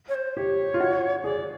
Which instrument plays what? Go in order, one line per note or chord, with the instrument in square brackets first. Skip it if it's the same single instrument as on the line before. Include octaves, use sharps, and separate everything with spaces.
[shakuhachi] C#5
C5
[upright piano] G4 [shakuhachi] C#5
[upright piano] F4
F#4
[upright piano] G#4 [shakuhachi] D5